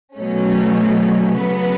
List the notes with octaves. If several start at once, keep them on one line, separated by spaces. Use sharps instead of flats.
B2 F#3 A3 C#4
C#3 F#3 B3